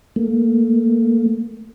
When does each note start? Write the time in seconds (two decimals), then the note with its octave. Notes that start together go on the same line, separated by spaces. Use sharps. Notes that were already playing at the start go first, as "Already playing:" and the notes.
0.16 A3 A#3